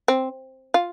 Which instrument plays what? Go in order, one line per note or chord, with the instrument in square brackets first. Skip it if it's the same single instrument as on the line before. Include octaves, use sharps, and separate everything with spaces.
[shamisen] C4
F4